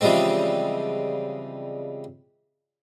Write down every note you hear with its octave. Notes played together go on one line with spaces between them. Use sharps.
C#3 E3 F3 G3 G#3 C4